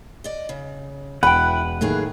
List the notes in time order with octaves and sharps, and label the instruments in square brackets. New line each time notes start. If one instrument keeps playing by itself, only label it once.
[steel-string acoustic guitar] D5 D#5
C#3
[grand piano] E1 [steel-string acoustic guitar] E4 [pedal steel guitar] B4 F#5 [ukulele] G5 B5
[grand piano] A2 D#3 [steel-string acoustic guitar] F#3 A#3 G#4